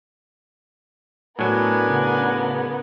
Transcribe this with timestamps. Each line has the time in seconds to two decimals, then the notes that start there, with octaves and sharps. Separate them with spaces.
1.39 A2 F#3 B3 D4 A#4 G#5
1.89 C#3